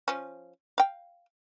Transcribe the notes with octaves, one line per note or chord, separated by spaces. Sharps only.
F3 C#4
F5 G5